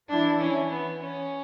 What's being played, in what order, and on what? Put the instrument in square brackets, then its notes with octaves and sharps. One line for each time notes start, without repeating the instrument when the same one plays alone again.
[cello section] E3 E4 [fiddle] D4
[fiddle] C#4
B3
C#4